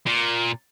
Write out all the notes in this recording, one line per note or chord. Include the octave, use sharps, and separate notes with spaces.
A#2